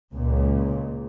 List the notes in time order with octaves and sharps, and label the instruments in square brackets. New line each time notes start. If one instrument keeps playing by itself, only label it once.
[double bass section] C#2 A#2